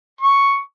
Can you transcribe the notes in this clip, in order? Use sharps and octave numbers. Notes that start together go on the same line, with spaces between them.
C#6